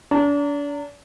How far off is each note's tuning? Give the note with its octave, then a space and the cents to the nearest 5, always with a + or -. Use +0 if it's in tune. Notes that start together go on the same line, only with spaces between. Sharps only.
D4 -35 A#5 -40